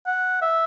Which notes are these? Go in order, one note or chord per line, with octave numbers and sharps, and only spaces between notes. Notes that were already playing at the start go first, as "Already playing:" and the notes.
F#5
E5